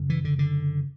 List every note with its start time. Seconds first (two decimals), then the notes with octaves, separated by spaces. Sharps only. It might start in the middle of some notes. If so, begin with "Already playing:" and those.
Already playing: F#2 C#3
0.10 E3
0.25 D3
0.39 D3